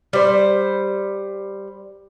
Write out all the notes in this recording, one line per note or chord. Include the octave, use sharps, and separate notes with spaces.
G3 C5